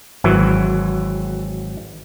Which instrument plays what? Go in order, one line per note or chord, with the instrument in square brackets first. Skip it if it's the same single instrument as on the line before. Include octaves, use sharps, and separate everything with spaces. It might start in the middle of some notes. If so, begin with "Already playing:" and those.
[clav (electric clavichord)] G#1 E3 F#3